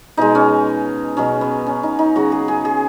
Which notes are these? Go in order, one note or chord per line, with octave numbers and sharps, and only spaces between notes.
B2 G#3 D#4
C#4
B2 F#3 C#4
B3
C#4
D#4
D#4
C#3 F#3 F#4
G#4
G#4
G#4